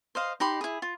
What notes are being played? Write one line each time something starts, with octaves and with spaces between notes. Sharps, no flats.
C5 D#5 F5
D#4 G4 B5 C6
E4 G#4
F4